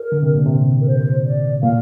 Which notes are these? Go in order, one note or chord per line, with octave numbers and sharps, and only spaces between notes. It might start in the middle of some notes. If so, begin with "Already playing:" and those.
Already playing: A#4
D3
C3
A#2
C3
A#4
C5
D5
A#2 F5